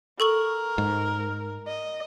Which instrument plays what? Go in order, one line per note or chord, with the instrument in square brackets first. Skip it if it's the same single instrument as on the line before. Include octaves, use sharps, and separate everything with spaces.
[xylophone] A4 C#6 F#7 [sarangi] A#4
[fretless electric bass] G#2
[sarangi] D#5